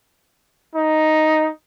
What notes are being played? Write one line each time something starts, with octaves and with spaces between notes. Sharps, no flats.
D#4